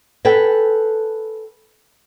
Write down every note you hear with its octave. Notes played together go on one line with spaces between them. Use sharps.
A4 B4 G5 G#5